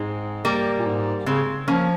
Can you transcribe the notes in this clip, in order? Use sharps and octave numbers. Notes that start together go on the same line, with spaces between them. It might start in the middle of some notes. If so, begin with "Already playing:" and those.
Already playing: G#2 G#3 C4
G3 A#3
A#2
G#2
C#3 G#3 C4
F3 A#3 C#4